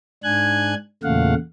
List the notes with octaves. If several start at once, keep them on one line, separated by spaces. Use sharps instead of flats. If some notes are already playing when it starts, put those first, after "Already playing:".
G#2 D4 G#5 F#6 G#6
E2 A#2 C#3 A3 F5 F#5